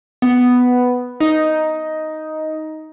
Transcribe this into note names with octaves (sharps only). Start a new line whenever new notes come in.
B3
D#4